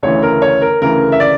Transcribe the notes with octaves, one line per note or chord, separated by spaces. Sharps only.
D2 C#3 E3 C#5
A#4
C#5
A#4
D2 C#3 E3 A#4
E5
D5